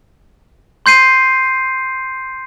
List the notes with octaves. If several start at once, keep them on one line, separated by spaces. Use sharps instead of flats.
C6 G6 C7 D#7